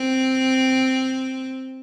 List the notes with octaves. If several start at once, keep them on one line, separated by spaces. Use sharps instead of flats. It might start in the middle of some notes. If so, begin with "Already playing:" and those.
Already playing: C4